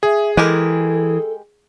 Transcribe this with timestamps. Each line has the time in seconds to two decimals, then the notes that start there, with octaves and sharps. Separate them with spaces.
0.03 G#4 E5
0.37 E3 G#3 G4 A4 A#4